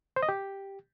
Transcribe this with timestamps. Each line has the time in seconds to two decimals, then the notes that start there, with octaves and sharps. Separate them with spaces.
0.16 C5
0.23 D#5
0.29 G4